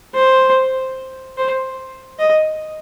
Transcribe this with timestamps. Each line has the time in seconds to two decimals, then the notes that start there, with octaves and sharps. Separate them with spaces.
0.15 C5
1.37 C5
2.19 D#5